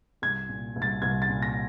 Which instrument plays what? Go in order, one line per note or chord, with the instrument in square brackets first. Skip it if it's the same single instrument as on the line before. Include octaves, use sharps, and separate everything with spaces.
[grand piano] C2 G#6
A#2
C2
A6
C2 G#6
A6
A#2
A#6